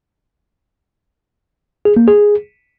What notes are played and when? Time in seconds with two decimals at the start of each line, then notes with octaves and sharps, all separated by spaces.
1.85 G#4
1.97 A#3
2.08 G#4